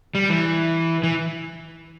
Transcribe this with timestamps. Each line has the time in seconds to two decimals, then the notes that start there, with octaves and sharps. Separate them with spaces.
0.15 G3
0.30 E3
1.04 E3